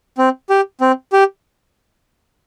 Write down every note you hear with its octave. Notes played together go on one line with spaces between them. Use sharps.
C4
G4
C4
G4